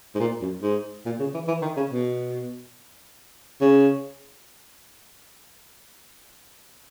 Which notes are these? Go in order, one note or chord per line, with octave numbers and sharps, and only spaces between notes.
G#2
A#2
F#2
G#2
A#2
C#3
E3
E3
D#3
C#3
B2
C#3